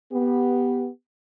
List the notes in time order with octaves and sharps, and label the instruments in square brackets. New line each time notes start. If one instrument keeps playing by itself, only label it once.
[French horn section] B3 G4